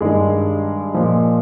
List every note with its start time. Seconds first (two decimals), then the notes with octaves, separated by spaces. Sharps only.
0.01 G2 D#3 G#3 G#4
0.94 A#2 F3